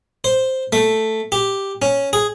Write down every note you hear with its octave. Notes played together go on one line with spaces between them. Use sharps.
C5
A3
G4
C#4
G#4